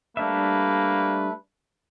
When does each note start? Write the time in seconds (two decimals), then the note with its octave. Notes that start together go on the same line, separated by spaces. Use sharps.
0.17 G3 A3 A#3 D4 B4 E5